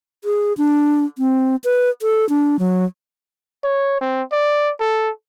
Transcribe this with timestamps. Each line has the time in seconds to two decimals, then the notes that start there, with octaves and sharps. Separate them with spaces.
0.24 G#4
0.58 D4
1.18 C4
1.64 B4
2.02 A4
2.29 D4
2.59 F#3
3.64 C#5
4.01 C4
4.32 D5
4.80 A4